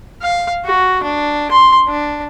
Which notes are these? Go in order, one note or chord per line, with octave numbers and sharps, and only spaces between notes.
F5
F#4
D4
C6
D4